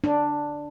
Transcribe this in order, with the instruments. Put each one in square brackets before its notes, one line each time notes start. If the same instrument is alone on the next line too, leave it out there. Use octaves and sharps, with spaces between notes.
[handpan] D4